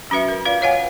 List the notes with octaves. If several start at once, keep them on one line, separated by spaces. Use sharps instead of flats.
F#3 C#4 F#4 B4 E5
A#4
F4 B4 D5 F5
B4 C#5 D#5 F5 F#5 G#5